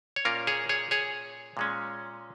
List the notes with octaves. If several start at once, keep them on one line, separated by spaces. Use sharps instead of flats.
C#5
A#2 A#3 C#4 F4 A#4
G#4 C#5
G#4 C#5
G#4 C#5
A#2 G#3 C#4